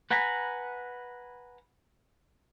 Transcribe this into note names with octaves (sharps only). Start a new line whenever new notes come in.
B4 F#5 G#5 A#5 B5